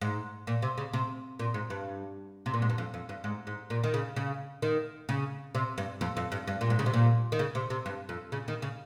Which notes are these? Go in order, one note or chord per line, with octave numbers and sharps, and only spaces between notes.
G#2
A#2
C3
C#3
C3
A#2
G#2
G2
C3
A#2
G#2
G2
F2
F2
G2
G#2
G#2
A#2
D#3
C#3
C#3
D#3
C#3
C3
G2
F2
F2
G2
G2
A#2
G#2
C#3
C3
A#2
D#3
C#3
C3
C3
G2
F2
C#3
D#3
C#3